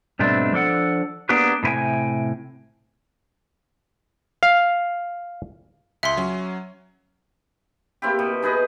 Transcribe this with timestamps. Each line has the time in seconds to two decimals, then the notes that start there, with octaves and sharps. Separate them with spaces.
0.19 G#2 B2 G3 A3 C4 D4
0.53 F3 D4 A4 F#5
1.29 A#3 B3 D4 G4 G#4 B4
1.63 A2 C3 B4 G5 G#5
4.43 F5
6.03 C#2 E5 C6
6.17 F#3 C#4
8.02 A#3 C4 E4 G4
8.19 B2
8.42 D#4 G#4 B4 D#5